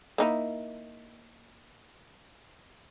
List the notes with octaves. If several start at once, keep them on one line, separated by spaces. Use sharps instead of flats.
A#3 D#4 E4